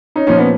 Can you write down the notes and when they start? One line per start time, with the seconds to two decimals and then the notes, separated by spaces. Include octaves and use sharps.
0.16 C#4 D#4
0.27 A#2 F3 C#4 D#4
0.38 B3 C#4